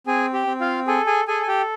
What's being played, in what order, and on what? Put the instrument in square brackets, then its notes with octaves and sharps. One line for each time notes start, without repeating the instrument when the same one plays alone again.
[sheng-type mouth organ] C4 G#4 G#5
G4 G5
C4
F4 F5
G#4 A4 G#5
G#4 G#5
G#4 A4 G#5
G#5
G4 G5